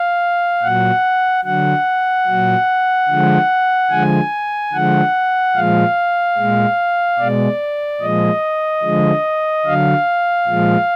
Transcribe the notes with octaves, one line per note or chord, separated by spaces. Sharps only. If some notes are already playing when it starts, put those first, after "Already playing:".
Already playing: F5
A#2 F#3 F#5
D3 F#3 F#5
A#2 F#3
D3 F3 G#3
D3 F3 G#3 G#5
D3 F3 G#3 F#5
A#2 F3 G#3 F5
A#2 G#3
B2 G#3 D5
A#2 F3 G#3 D#5
D3 F3 G#3
D3 F#3 F5
A#2 F3 G#3